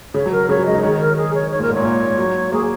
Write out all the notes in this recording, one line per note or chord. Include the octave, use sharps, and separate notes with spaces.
C#3 C#5
F#3
A#4
C#3 C#5
F#3
G#3 D#5
D#4
D#3 C#5
A#4
G#4
C#5
C#5
A#2
A#4
G#2
A#2 C#5
A#2
F#3
A#3 G#4